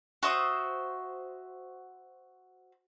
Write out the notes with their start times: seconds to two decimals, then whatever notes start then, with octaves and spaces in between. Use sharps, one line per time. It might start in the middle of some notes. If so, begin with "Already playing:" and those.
0.23 F#4 C5 E5 D#6